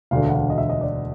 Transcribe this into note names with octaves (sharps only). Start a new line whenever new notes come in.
E1 D2 D3 F5
F#5
F5
D#5
E5
D#5
D5